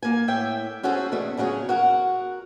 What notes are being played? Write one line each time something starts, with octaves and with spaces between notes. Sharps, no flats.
A#3 G#5
A2 E5 G5
C#4 F#4 G#4 A4 C5
E2 B2 A3
D2 C#3 F#3 G#4 C#5
F#4 A#4 F#5